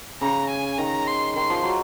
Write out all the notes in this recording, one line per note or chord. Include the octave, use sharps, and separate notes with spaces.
C#3 A#5
G#5
D#3 A#5
C6
D#3 C6
F3
F#3